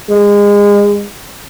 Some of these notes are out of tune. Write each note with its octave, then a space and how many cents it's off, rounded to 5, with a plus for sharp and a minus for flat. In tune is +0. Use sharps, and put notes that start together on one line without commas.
G#3 -30